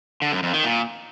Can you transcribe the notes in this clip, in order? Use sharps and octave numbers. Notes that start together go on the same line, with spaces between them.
D3
F#2
F2
D#3
A#2